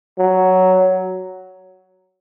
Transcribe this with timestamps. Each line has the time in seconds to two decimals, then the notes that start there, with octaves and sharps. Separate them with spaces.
0.18 F#3